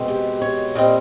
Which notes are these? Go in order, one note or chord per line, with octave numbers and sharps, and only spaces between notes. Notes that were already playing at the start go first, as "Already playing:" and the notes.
Already playing: B2 G#3 C4
G4
C#5
A#2 G3 C4 D#5